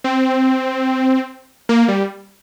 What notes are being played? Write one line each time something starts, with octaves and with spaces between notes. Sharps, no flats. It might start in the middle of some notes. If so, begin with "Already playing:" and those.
C4
A#3
G3